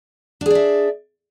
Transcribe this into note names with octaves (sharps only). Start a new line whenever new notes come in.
D4 G#4 D5 E5